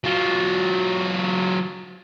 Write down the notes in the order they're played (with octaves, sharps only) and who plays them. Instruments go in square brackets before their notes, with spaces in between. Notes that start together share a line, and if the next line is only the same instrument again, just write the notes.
[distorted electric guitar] F#3 F4